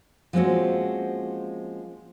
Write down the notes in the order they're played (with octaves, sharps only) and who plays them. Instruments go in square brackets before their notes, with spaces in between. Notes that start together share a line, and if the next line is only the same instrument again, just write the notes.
[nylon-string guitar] F3 G#3 A#3 C4 C#4 F#4